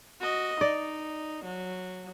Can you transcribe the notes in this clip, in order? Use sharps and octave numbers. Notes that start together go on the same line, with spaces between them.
F#4 D#5
D#4 D5
F#3